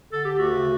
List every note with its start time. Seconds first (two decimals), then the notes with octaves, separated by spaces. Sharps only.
0.12 D3 A4
0.25 G4
0.32 D2
0.38 F#4
0.50 C#3